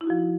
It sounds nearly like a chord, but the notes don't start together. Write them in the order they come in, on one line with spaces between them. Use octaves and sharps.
E4 D#4 F#4 F3